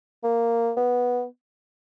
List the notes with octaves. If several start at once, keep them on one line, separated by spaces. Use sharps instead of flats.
A#3
B3